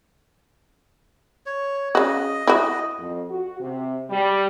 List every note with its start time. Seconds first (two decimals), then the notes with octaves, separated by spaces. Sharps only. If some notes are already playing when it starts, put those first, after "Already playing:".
1.46 C#5
1.95 C#3 F#4 D#5
2.47 E4 F#4
2.99 F2
3.29 F#4
3.60 C3
4.10 G3